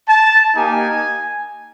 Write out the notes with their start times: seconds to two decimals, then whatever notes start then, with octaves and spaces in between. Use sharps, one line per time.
0.08 A5
0.55 A#3 D#4 G4 G#5